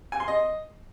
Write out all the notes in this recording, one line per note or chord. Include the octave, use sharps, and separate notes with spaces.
G#5
C6
D#5